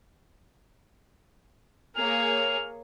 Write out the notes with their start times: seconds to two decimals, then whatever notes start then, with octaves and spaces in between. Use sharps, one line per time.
1.96 A#3 G#4 C#5 F6